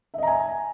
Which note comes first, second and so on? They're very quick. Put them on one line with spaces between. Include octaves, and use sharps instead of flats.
E5 D#5 A#5 G#5